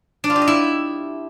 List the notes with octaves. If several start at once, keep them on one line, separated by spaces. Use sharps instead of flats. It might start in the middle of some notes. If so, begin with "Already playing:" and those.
D4
F4
G4
D#5
E4